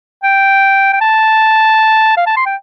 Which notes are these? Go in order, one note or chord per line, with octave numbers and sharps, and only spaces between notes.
G5
G5
A5
F5
A5
C6
G5